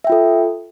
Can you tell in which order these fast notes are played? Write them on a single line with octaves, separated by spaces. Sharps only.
E5 G5 F4 A4